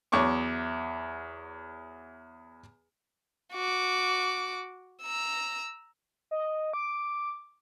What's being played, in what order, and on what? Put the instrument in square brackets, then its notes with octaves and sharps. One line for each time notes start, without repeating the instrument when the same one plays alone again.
[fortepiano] E2 F#3 C#6 D6
[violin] F#4 D6
A#5 E6
[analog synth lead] D#5
D6